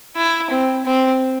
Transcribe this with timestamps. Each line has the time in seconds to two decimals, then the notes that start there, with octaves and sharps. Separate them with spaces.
0.17 E4
0.50 C4
0.85 C4